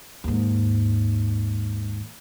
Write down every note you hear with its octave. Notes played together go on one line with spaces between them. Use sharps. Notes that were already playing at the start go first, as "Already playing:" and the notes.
D#2 G#2